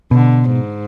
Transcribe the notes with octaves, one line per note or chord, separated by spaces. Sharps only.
B2 D3
G#2